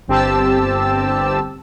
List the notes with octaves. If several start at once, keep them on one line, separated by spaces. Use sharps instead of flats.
G1 C4 G4 A5 E6